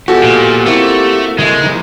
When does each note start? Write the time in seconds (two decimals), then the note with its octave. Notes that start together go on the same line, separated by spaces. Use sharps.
0.08 B2 F3 G#3 F#4 G4 A4
0.23 A#2
0.66 A3 A#3 C4 E4
1.38 C#3 G#3 A#4 E5
1.64 F3 D#4